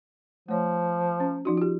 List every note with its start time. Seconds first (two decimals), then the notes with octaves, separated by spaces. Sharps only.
0.49 F3 A3 C#5
1.20 C#4
1.45 F3 D#4 F#4
1.57 F4 G4